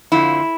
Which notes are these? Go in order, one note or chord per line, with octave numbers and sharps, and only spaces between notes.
F2 D3 F3 E4